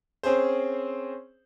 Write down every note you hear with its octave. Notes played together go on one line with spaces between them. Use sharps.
C4 C#4 G#4 C5